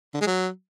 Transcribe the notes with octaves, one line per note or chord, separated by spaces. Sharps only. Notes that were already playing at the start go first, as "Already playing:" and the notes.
D3
G#3
F#3